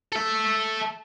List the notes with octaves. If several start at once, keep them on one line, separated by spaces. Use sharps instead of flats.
A4 E5